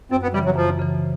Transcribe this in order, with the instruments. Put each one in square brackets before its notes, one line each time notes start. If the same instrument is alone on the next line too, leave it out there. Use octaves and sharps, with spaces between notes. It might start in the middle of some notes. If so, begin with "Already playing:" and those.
[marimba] F#2 [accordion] C4
[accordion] B3
[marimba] C#3 E3 [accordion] G3
[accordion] F#3
[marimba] F#2 [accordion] F3
[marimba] C#3 E3